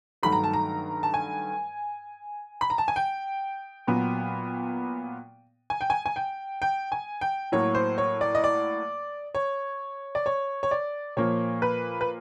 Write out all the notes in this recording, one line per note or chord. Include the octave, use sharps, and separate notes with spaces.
G2 D#3 F#3 A3 B5
A#5
A5
A#5
A5
G#5
B5
A#5
A5
G#5
G5
A#2 F#3 B3
G#5
G5
G#5
G#5
G5
G5
G#5
G5
A2 F#3 A#3 C#5
C5
C#5
D5
D#5
D5
C#5
D5
C#5
C#5
D5
A#2 F3 A#3 C#5
B4
B4